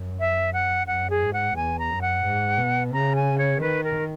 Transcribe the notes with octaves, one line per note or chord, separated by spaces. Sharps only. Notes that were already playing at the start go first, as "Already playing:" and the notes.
Already playing: F#2
E5
F#5
F#2 F#5
G#4
G#2
F#5
E2 G#5
A#5
F#2
F#5
G#2
B2
C#3 A#5
G#5
C#5
D#3 B4
A#4